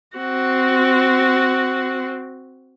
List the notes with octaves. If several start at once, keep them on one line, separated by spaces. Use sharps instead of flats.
C4 F#4